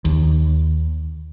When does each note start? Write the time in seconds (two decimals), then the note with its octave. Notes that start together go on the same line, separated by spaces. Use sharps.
0.05 D#2